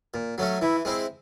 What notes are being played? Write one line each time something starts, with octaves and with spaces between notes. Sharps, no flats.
A#2
F#3 A3 C#4
E3 E4
G#3 C4 E4